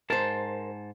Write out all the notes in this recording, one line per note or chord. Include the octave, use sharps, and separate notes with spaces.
G#2 A#4 C5 A5